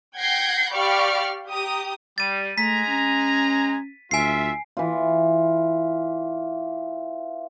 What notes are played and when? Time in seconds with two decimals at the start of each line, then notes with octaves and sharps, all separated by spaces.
0.15 F#5 G5 G6 G#6 A#6 C7
0.72 G4 D5 F5 B5 C#6 F6
1.47 G4 A#5 D#6
2.18 G3 A6 D#7
2.58 G#3 A3 G#5 A#5 B6
2.88 C#4
4.11 D2 F4 E5 G#5 C7
4.77 E3 F4